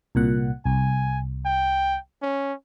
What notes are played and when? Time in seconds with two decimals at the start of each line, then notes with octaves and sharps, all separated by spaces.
0.15 C2 A#2 F#5
0.65 C2 G#5
1.46 G5
2.22 C#4